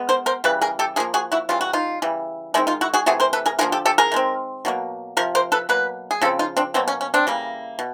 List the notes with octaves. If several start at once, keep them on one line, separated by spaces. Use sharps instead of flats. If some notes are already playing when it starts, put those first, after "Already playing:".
Already playing: G#3 B3
A#4 C5
A#4 C5
C#3 E3 G3 B4
G#4 A#4
G4 A4
F3 A#3 G#4 A#4
F#4 G#4
E4 F#4
C#3 E3 G3 F4
F#4
D#4 F4
C#3 E3 G3
D#3 G#3 C4 D4 E4
D#4 F4
E4 F#4
F#4 G#4
C3 E3 A3 F#4 G#4
A#4 C5
A4 B4
G#4 A#4
D3 F3 A#3 G#4 A#4
G4 A4
G4 A4
G#4 A#4
D#3 G#3 C4
B2 F#3 A#3
C3 F3 A#4
A#4 C5
A4 B4
B2 F#3 A#3 B4
G#4
C#3 F3 C4 A4
D#4 F4
C4 D4
B2 F#3 A#3 C4
C#4
C#4
C4 D4
C#3 E3 G3 A#3
B2